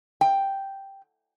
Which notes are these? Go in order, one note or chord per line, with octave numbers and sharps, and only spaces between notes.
G5